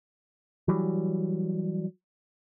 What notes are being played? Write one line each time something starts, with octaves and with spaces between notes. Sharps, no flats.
E3 F#3 G3